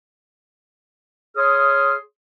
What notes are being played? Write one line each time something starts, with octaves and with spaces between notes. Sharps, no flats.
G#4 C#5 C6 D#6 F6